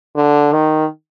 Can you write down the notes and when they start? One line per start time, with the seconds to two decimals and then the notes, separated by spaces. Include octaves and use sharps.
0.16 D3
0.53 D#3